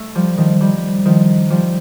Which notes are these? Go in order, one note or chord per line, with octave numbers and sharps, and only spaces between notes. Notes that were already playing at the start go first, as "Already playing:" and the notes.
Already playing: A3
F3 G3
D#3 F3
F3 G3
D#3 F3
F3 G3